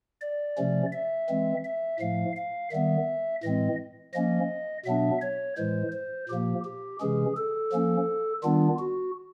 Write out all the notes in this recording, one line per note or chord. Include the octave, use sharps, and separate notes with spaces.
D5
C3 F3 A3 C#4
E5
E3 G#3 C4
E5
A2 F3 A3 F5
F5
D#3 G3 B3 E5
A2 E3 G#3 C4 D#5
F3 A#3 C#4 D#5
B2 F#3 B3 D4 E5
C#5
A2 E3 G#3 C5
C5
A#2 F3 A#3 G4
G4
C3 E3 G#3 C#4 G#4
A4
F3 A#3 C#4
D#3 G3 B3 D4 F4
F#4